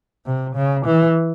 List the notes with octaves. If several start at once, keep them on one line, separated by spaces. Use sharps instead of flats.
C3
C#3
E3